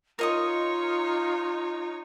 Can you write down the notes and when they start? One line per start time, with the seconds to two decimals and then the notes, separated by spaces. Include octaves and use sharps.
0.19 D#4 F4 A#4 C#5 D#5 D#6